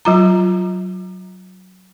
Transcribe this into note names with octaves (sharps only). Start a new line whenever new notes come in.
F#3 F4 A#5